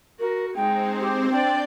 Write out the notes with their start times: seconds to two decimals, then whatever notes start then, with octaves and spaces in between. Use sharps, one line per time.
0.19 F#4 A#4
0.55 G#3 C4 D#4 C5 G5
1.00 G4
1.31 D4 D5 G5 G6